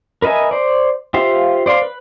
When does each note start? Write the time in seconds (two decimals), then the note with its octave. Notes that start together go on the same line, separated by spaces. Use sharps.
0.22 A#4 B4 D#5 E5 G#5
0.51 C5 D5
1.14 F4 G4 C5 E5 F5
1.66 C5 D5 F5 C6
1.82 B4